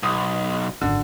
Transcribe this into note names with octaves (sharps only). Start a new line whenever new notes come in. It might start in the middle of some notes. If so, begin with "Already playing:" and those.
B1 D#6
G#1 F#2 D3